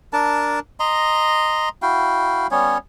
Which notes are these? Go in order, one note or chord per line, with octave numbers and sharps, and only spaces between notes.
D4 A#4 A5
D#5 A#5 C6
E4 F#4 F5 G5
G3 B3 C#4 C#5